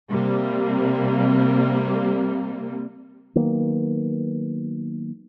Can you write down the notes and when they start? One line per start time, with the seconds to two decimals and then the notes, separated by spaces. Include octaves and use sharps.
0.10 C3 G3 A#3
3.35 D#3 F#3 A#3 B3